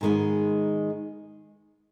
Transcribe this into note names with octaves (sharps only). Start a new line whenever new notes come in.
G#2 D#3 G#3 B3